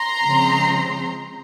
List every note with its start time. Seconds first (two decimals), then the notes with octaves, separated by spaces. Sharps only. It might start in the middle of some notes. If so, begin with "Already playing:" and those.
Already playing: A#5 C6
0.25 C#3 F3 G#3 C4